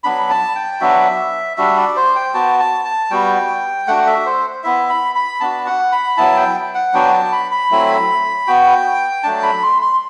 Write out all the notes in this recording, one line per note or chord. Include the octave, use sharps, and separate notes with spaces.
F#3 B3 D4 B5
A5
G5
F#3 B3 D4 F#4 E5
G3 D4 F#4 E5
D5
C5
G5
B3 F#4 A5
A5
A5
G3 B3 F#4 G5
A3 D4 F#4 F#5
E5
C5
B3 E4 E5
B5
B5
B3 D4 F#4 A5
F#5
B5
F#3 B3 E4 A5
G5
F#5
F#3 B3 D4 F#4 G5
A5
B5
B5
F#3 A3 C4 E4
B3 F#4 G5
F#3 A3 D4 A5
B5
C6
C6